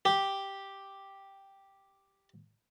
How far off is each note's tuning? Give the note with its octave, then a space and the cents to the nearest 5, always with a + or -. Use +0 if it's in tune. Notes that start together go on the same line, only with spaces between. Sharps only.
G4 +0